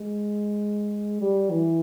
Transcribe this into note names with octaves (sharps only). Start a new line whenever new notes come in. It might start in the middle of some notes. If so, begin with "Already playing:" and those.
Already playing: G#3
G3
E3